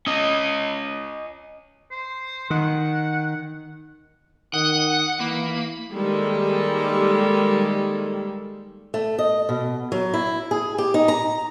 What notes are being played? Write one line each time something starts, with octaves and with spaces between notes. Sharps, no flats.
C#4 D#5
C5
D#3 F#5
D#3 F#5 D#6 F#6
E3 A#3 B5
D#3 G3 G#3 A#3 A4
A3
D#5
B2
F#3
E4
G#4
G4
D#4
A#5